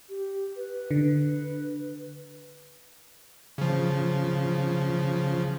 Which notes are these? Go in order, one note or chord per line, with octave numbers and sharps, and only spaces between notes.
G4
B4
D3
C#3 F3